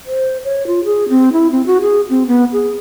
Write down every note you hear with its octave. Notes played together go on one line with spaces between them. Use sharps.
C5
C#5
F4
G#4
C4
E4
C4
F#4
G#4
C4
B3
G#4